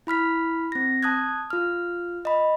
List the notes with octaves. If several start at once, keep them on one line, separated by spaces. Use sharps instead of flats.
E4 B5 F6 B6
C4 A#6
A5 D#6 F#6 G#6
F4 F6
D#5 B5